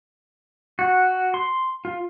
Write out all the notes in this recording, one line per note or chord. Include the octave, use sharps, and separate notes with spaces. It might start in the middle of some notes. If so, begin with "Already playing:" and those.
F#4
C6
F4